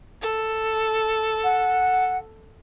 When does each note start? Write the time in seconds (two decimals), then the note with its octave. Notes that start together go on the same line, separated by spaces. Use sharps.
0.22 A4
1.44 F#5